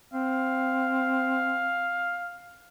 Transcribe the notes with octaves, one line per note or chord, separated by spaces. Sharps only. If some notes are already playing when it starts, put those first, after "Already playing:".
C4 F5